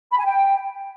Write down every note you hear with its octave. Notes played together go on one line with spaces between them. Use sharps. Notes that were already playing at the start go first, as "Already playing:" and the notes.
B5
G#5
G5